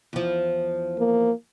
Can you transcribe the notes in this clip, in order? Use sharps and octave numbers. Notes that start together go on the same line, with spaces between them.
E2 F3
A#3